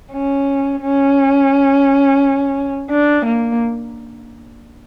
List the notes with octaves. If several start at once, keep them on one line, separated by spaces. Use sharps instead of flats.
C#4
C#4
D4
A#3